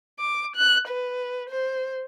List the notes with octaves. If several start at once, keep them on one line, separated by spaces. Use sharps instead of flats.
D6
F#6
B4
C5